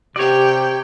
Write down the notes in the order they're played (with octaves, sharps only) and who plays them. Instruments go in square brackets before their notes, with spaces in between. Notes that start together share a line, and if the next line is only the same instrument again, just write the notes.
[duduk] C3 [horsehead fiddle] G4 G5 [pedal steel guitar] C#5 D5